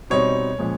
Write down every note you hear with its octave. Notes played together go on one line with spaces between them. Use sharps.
B2 G3 C4 D#4 C#5
A#2 F3 G#3 C#4